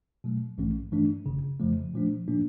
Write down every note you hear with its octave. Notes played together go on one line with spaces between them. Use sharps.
B2 F#3 A3
A#1 G#2 E3 A3 C#4
G2 E3 A3 D4
G1 F#2 C#3
F2 C#3 F3 A3
A#2 F3 A3 D4
A#2 F3 A#3 D4